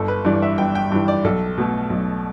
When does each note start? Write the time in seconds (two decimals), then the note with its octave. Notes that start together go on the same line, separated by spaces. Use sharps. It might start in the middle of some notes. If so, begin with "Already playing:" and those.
Already playing: G1 A4
0.08 B4
0.25 G2 E3 D5
0.42 E5
0.58 G1 G5
0.75 G5
0.92 G2 E3
1.08 D5
1.24 B1 A4
1.58 B2 A3
1.90 B1